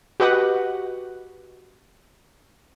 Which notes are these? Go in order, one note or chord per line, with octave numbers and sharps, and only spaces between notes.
F#4 G4 B4 D#5 F#5